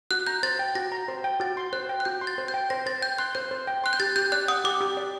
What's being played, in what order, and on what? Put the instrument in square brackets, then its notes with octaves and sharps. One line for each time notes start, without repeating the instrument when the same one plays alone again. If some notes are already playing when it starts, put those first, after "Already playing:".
[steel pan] F#4 [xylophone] F#6
[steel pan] A#5 [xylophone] G6
[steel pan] C5 [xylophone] A6
[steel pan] G5
[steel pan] F#4 [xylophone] A#6
[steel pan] A#5
C5
G5
[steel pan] F#4 [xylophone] A6
[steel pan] C6
[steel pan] C5 [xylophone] F#6
[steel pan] G5
[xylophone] F#6
[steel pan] F#4 [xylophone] G6
[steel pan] C6
[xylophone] A6
[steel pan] C5
[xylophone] G6
[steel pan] G5
[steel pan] C5 [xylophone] A#6
[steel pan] C5 [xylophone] A6
[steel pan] G5 [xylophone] G6
[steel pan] C6 [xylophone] F#6
[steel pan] C5 [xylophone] G6
[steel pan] C5
G5
[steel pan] C6 [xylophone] F#6
[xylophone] G6
[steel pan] G4 [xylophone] A6
[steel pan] G4 [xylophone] G6
[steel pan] D5 [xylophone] F#6
[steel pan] F#5 [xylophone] D#6
[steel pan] G4 [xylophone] D6
[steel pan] G4
D5